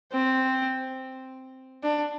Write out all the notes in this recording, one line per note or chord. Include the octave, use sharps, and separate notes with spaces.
C4
D4